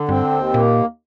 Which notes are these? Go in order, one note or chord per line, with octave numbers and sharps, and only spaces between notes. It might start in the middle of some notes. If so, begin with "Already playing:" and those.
Already playing: D3
G2 C4
D#2
A#2 A#3